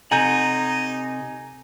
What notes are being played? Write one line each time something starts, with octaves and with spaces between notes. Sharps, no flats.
C3 D#4 A4 F#5 G#5 A#5 G6